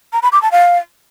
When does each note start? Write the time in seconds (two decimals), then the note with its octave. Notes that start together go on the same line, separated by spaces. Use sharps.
0.13 A#5
0.22 B5
0.32 D6
0.42 A5
0.52 F5